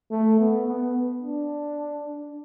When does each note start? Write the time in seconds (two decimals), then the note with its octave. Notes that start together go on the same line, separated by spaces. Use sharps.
0.11 A3
0.40 B3
0.67 B3
1.23 D4